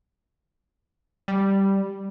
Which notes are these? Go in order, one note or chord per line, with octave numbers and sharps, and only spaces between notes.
G3